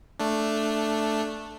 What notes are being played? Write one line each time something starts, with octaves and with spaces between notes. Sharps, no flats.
A3 D4